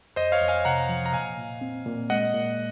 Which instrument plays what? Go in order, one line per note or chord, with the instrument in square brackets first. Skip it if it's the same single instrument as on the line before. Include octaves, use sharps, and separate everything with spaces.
[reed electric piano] F2 [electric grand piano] C5 D#5
[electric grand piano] C#5 F5
[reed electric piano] F2
[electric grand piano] F5 G#5
[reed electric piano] C3 [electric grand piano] F#5 A#5
[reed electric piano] F3
[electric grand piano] A#5
[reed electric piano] A#2 [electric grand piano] F5 G#5
[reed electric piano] A#2
C4
A#2
[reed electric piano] G#3 [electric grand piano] D#5 F#5
[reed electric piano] A#2